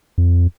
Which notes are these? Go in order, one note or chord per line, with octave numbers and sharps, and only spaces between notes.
F2